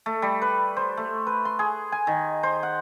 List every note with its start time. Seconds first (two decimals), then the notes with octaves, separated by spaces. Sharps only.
0.06 A3
0.22 G3
0.42 B4
0.77 C5
0.97 A3
1.27 B4
1.45 C6
1.59 G#4
1.92 G#5
2.07 D#3
2.43 C5
2.63 F#5